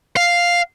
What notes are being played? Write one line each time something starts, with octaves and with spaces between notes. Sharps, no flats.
F5